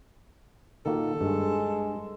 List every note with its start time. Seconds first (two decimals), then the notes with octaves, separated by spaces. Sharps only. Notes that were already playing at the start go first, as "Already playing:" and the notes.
0.86 A#2 D#3 A#3 F#4 A4
1.21 G2 G#3